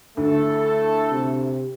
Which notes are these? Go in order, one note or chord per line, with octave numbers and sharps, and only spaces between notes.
D2 A3 E4 A4
C3